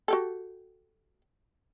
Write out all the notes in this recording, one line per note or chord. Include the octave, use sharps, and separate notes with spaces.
F#4 G4 A4